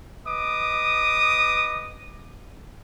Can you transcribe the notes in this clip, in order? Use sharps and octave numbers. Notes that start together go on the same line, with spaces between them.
B4 D#5 D6 D#6